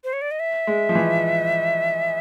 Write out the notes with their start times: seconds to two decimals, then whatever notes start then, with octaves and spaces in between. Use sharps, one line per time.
0.04 C5
0.13 C#5
0.21 D5
0.31 D#5
0.39 E5
0.67 G#3
0.89 F3
0.95 E3